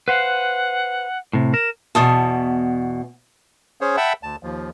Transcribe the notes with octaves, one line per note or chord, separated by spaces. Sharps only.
B4 C5 F5 F#5
A2 C3
A#4 E7
E2 B2 A5 D#6
C#4 G#4 C5 C#5
E5 F#5 G5 A5 B5
D2 A5
D#2 F3